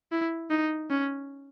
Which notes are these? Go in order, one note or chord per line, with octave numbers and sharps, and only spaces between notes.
E4
D#4
C#4